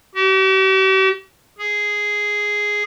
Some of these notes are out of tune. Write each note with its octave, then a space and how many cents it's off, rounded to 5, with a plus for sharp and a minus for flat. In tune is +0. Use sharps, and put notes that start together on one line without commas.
G4 -45
G#4 +0